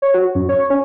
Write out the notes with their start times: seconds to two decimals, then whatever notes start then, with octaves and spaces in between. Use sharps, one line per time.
0.02 C#5
0.14 F#4
0.35 F#2
0.49 C#5
0.70 C#4